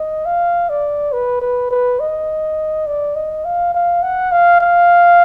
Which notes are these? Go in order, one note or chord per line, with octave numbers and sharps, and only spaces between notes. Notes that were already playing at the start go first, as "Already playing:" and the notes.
Already playing: D#5
F5
D5
B4
B4
B4
D#5
D5
D#5
F5
F5
F#5
F5
F5